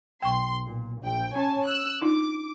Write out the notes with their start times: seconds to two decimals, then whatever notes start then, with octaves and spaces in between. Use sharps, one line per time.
0.22 B1 G5 C6 C#6
0.67 A#2
1.03 A#1 G5
1.35 C#4 C#5 G#5 A5
1.66 E6 F#6
2.01 D4 D#4 F4 D6